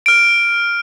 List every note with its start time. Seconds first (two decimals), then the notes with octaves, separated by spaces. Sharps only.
0.06 F6 D7